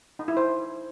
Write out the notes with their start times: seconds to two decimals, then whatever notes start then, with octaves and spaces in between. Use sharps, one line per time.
0.19 D#4
0.28 E4
0.37 C5